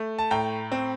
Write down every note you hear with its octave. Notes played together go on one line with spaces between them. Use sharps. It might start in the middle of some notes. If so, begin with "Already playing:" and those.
Already playing: A3
A5
A2 G5 A#5
C4